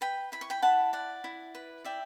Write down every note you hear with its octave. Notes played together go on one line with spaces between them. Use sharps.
B4 G5 B5
E4 B5
C#6
G5 B5
E4 F#5 A5
D5 F#5
E4
B4
D5 E5 G5